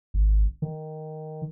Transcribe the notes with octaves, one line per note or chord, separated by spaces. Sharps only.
G#1
D#3